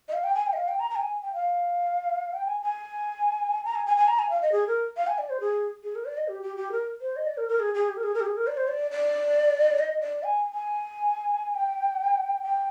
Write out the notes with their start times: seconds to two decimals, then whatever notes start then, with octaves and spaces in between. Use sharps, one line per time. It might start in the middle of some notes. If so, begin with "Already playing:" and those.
0.08 D#5
0.13 F5
0.24 G5
0.35 G#5
0.47 G5
0.53 D#5
0.57 F5
0.68 G5
0.80 A#5
0.90 A#5
0.96 G5
1.01 G#5
1.23 G5
1.34 F5
2.33 G5
2.47 G#5
2.62 G#5
3.65 A#5
3.75 G#5
3.86 G#5
3.97 G#5
4.08 A#5
4.19 G#5
4.30 F5
4.42 D#5
4.52 G#4
4.68 A#4
4.97 F5
5.07 G#5
5.18 D5
5.30 C5
5.41 G#4
5.84 G#4
5.95 A#4
6.05 D5
6.18 D#5
6.28 G4
6.43 G4
6.57 G4
6.72 A#4
7.01 C5
7.16 D#5
7.27 D5
7.37 A#4
7.49 A#4
7.60 G#4
7.74 G#4
7.89 G4
7.97 A#4
8.03 G#4
8.14 A#4
8.21 G4
8.25 G#4
8.37 A#4
8.47 D5
8.57 C5
8.68 D5
8.91 D5
9.79 D#5
10.01 D5
10.23 G#5
10.53 G#5
11.55 G5
12.43 G5